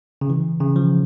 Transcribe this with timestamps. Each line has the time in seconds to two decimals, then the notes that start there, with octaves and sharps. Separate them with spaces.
0.21 C#3
0.30 E3
0.60 C#3
0.76 F3